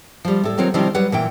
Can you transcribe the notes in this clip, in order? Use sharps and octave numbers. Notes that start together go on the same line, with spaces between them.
F3 G3
A2 A4
D#3 F#3 C4 F4 C#5
C3 D#3 F3 G3 C4 E4
F#3 G3 B4 F#5
A#2 E3 G5